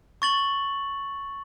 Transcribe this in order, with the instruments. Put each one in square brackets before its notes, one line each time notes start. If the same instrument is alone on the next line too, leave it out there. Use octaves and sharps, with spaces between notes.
[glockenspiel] C#6 A6 F#7